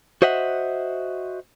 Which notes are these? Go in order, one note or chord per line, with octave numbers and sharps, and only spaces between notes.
F#4 C5 D#5 E5 F#5